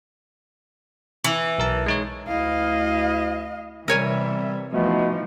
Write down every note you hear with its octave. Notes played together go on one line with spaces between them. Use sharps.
E3
B1 A#4 A5
G#3 D#4 C#5
D2 E4 D#5 F5
C3 E3 G3 A#4 C#5 E5 G#5
B2 E3 F3 A3 D#4